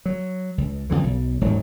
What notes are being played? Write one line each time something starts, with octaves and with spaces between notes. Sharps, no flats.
F#3
C#2
F2 A2 D3 E3
B1
D#1 G#2 F#3